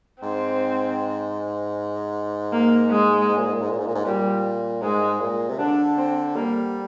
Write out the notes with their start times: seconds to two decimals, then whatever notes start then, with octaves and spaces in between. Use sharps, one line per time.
0.23 G#2 C4
2.52 A#3
2.91 G#3
3.29 G#2
3.38 A#2
3.46 G#2
3.54 A#2
3.62 G#2
3.70 A#2
3.79 G#2
3.87 A#2
3.95 G#2
4.05 A#2 G3
4.82 G#2 G#3
5.21 A#2
5.49 C3
5.59 D3 D4
5.98 C4
6.36 G3 A#3